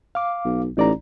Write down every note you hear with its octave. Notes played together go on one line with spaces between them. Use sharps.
F5 D6
B1
A1 D#4 D5 A#5